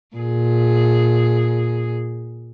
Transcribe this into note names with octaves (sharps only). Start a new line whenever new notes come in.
A#2 G#4